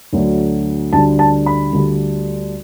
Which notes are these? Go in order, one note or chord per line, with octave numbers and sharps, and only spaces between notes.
D2 D3 F#3 A3
D2 D3 G3 D4 A5
A5
B5
D2 D3 G3 D4